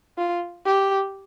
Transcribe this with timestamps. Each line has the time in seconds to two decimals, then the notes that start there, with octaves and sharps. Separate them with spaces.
0.18 F4
0.65 G4